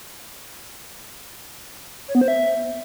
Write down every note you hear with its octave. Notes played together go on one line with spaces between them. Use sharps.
C#5
B3
C5
E5